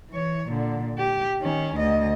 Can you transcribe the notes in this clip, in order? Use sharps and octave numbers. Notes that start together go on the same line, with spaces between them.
E3 C#5
A#2 D3
G4
D#3 C#4
D2 D#5